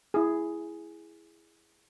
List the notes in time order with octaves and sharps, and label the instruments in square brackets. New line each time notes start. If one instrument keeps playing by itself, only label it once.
[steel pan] E4 G#4